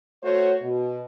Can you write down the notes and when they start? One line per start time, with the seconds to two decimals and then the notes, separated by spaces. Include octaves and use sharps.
0.23 A3 F#4 C5 C#5
0.63 B2